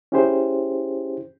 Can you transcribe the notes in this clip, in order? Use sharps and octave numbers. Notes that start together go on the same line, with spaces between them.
C#4 E4 G4 G#4 C5